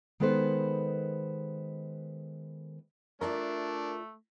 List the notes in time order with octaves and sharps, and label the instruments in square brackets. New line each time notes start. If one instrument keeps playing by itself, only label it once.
[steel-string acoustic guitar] D#3 G#3 B3 A4 B4 C5
[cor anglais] A3 [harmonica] D4 [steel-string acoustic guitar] F4 D5 E5 [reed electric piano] A#4